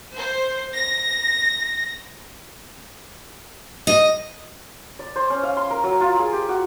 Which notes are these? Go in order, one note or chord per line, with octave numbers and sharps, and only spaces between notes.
C5
A#6
D#5
D5
C5
C#4
F5
C6
A#4
F#3
F4
G#4
G4
F#4